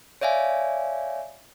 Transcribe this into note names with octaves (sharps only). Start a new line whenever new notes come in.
C#5 D5 E5 F5 G#5